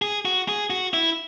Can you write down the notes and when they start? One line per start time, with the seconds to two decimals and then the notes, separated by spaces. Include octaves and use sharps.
0.02 G#4
0.25 F#4
0.48 G#4
0.70 F#4
0.94 E4